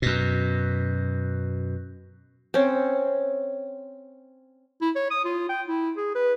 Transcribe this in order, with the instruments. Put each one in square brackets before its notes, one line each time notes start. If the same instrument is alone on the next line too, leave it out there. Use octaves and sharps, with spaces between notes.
[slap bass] F#2 B2
[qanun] C4 C#4
[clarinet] E4
C#5
D#6
F4
G5
E4
G#4
B4